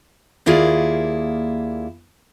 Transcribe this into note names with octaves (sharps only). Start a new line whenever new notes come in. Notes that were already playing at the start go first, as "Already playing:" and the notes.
D#2 A#3 E4 F4 G#4 D5